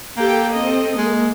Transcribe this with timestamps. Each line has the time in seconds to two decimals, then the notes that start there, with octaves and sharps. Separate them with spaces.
0.17 A#3 G4 A4 G5
0.52 C4 A4 D#5
0.97 G#3 A#3